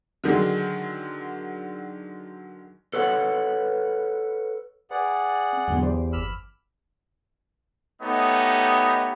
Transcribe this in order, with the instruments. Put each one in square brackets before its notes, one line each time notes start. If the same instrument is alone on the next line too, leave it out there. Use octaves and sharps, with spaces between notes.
[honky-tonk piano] D3 D#3 F#3 G#3
[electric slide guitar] A4 B4 C#5 F#5
[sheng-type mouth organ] G#4 D5 F#5 [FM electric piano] B4
[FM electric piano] C4
[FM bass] E2 [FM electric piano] G#2 D3 F#3
[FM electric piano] G4 C5 D5
[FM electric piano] G1 D6 [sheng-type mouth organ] B5 E6 F6
[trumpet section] A3 B3 D#4 G4 C#5 D#5